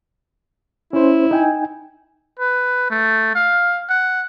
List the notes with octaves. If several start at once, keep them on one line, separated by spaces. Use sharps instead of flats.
C#4 E4 C5
D#4 G5 G#5
B4
A3
F5
F#5